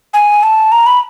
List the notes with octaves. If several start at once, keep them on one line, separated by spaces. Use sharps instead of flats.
G#5
A5
A#5
B5